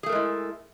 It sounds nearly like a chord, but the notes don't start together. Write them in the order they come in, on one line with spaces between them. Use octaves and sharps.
G#4 A3 A#4 G#3 E4